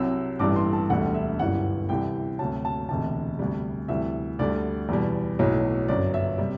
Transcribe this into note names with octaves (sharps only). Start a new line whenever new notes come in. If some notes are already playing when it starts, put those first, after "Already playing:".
Already playing: C2 C3 F#3 E6
A1 G2 E3 G3 D6
C6
A5
E1 D2 D3 G3 F#5
E5
G1 F#2 E3 G3 F#5
C2 C3 E3 G3 G5
D2 C3 F#3 A5
A5
E1 D2 C3 A5
D2 C3 G3
D2 C3 E3 G3 E5
D2 D3 G3 D5
E2 B2 G3
B1 A2 F#3
G1 F#2 F#3 D5
E5
C3 G3